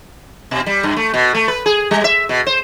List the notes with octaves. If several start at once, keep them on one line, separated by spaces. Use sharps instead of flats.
B2
G3
G2
A3
B2
A3
B4
G#4
G3
E5
B2
C5